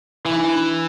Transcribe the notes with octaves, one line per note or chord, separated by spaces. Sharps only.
E3 E4
D#4
D4 E4